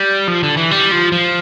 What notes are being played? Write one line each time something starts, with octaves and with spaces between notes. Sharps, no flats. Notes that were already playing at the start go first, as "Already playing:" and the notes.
Already playing: G3
F3
D3
E3
G3
F3
F3